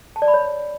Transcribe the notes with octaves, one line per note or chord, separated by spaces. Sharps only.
A5
D5
B5
C#5